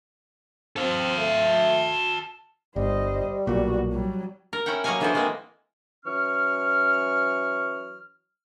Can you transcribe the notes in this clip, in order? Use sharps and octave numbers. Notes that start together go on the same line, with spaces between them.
C4 A4 F5
A3
G1 G3 C5 D#5
B1 A#2 B3 F#4
F#3 G3
A#4
C#4 E4 F#5 G5
F#3 A#3 C#5 D#5 F5 G#5
D3 E3 B3 E4 G#4 C5
E3 G#3 A#3 C4 G#4
E3 F#3 C#4 C#6 F6